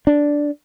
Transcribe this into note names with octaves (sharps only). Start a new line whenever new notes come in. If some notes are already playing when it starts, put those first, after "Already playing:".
D4